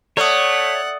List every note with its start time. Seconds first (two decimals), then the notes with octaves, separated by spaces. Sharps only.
0.17 A3 C#5 D5 F#5 D#6